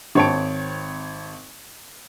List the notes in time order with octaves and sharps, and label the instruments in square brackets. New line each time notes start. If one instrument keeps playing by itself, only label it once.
[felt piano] G#1 C4 C#5 G5 A5 D7